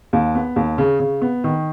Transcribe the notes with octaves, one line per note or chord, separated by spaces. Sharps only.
D#2
B3
D#2
C#3
C#3
B3
D#3